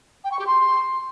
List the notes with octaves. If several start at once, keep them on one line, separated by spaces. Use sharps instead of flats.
G5
C#6
G4
C6